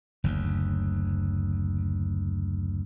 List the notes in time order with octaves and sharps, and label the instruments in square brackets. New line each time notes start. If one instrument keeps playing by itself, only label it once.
[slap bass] F#1 D2